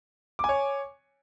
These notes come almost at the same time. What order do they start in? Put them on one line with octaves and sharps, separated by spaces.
D6 G#5 C#5